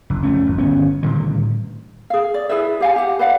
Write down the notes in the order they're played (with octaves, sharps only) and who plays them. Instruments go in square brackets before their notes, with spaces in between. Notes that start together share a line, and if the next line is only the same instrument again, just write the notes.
[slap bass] F#1
F2 A3 C#4
G#1
G1 D#3 B3 C#4
A2 D3 D#3 G3
[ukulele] G#4 F5
D5
E4 G#4 B4 E5
G4 F5 G#5
G4 F#5
B4 D5 F5 F#5